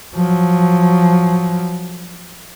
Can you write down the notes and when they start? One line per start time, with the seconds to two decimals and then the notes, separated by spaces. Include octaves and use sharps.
0.15 F3 F#3